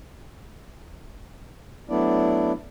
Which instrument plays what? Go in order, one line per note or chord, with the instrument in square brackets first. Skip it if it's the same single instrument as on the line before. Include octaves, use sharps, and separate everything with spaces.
[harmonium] F#3 A3 B3 D4 E4 D5